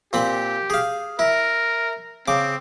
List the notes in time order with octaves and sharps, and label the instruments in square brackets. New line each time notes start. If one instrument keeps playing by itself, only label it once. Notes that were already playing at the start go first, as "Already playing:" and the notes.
[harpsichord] A#2 C4 B5 [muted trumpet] G4
[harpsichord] G#4 F5
[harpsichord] E4 [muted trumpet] A#4
[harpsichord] C#3 D6 [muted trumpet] C4